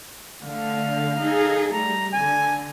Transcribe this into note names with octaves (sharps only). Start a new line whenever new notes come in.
D3 A3 F5
D#4 G#4 A4
G3 A3 A#5
D3 G#5